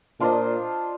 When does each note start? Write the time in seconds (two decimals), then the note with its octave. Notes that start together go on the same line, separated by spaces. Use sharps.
0.20 A#2 D4 F4 C5 D#5